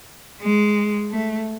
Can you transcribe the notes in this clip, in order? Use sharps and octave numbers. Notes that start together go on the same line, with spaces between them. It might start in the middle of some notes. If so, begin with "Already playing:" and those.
G#3
A3